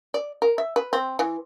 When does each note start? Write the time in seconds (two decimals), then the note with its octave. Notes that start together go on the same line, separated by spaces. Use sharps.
0.14 D5
0.42 A#4
0.58 E5
0.76 B4
0.93 C4
1.19 E3